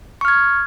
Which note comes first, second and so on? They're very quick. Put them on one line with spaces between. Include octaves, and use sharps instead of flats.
C#6 F6 G#6